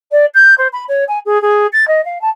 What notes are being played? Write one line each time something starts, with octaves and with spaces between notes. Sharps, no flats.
D5
G6
C5
B5
C#5
G#5
G#4
G#4
A6
D#5
F5
A5